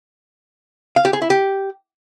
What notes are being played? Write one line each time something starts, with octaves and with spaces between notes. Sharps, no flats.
F5
G4
G#4
E4
G4